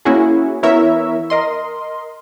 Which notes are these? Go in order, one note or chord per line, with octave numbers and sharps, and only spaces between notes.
A#3 C#4 E4 F#4 G#4
E3 B3 E4 A#4 C#5 E5
A#4 D#5 C6